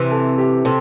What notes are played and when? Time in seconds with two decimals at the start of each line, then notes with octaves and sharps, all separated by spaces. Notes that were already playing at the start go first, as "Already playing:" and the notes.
Already playing: C3 E3
0.11 A4
0.38 G4
0.65 C3 A4